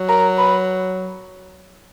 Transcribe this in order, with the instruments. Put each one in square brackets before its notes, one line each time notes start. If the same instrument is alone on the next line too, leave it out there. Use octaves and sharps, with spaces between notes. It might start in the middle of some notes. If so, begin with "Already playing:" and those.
Already playing: [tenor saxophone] F#3
[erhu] A#4
B4